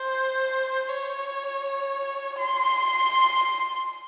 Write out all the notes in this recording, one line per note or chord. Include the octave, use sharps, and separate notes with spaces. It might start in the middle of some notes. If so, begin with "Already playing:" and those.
Already playing: C5
C#5
C6